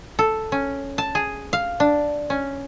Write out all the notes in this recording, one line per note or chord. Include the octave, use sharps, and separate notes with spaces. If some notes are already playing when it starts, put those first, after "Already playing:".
A4
C#4
A5
G#4
F5
D4
C#4